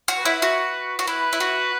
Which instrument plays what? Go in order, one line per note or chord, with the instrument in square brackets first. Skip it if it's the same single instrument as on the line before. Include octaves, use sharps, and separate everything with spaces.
[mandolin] F#4
[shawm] B4
[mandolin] E4
F#4
F#4
[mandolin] E4 [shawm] B4
[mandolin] E4
F#4